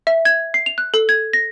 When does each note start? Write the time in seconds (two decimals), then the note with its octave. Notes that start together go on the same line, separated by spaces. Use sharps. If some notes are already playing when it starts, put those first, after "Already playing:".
0.07 E5
0.25 G#6
0.54 C7
0.66 F7
0.78 F#6
0.94 A4
1.09 G#6
1.33 A#6